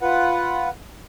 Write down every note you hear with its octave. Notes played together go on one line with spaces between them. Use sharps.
F4 B4 F#5